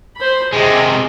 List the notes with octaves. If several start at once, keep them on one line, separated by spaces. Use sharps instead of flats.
C5 B5
C3 G#3 G#4 D#5